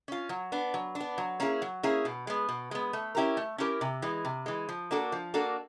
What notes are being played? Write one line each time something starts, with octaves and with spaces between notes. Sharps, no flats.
C#4 F4
F#3
B3 D4
F#3
D4
B3
F#3
A#3 C#4 E4 G#4
F#3
A#3 C#4 E4 G#4
B2
G#3 B3
B2
G#3 B3
A3
C#4 E4 G4 A#4
A3
C#4 E4 G4 A#4
C3
E3 G#3
C3
E3 G#3
F3
A#3 D4 F#4 A4
F3
A#3 D4 F#4 A4